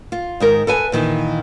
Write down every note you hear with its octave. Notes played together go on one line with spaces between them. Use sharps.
F4
G#2 D#3 A#4
A4 B4 G#5
A#2 D#3 E3